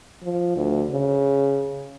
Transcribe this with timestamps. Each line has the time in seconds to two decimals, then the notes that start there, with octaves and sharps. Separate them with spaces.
0.23 F3
0.56 D2
0.91 C#3